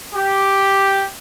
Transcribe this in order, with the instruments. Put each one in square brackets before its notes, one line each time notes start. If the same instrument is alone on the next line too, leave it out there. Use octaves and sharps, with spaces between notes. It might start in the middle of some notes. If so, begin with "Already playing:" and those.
[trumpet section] G4